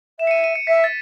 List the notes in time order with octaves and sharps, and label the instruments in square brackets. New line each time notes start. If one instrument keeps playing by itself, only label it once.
[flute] E5 [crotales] E7
[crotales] C#7
D#7
D#7
C#7
[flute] E5 [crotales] B6
[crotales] A6